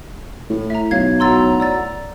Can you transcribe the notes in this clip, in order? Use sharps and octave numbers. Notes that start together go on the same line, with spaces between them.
A2
E5 A#5
B1 C#5 F5 G#6
A2 F#3 A#5 C6 E6 A6
D5 E6 A6